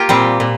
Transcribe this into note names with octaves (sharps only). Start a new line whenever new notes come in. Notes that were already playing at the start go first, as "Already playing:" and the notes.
Already playing: A#3 F4 G4
A#2 G3 C4
A#2